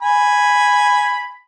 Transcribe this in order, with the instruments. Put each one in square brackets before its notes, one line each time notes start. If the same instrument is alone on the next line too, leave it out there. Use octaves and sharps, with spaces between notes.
[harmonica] G#5 B5